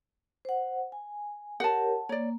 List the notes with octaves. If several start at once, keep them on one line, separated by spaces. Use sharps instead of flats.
C5 F#5
G#5
G4 A#4 C#5 F#5 A5
A#3 C#5 D5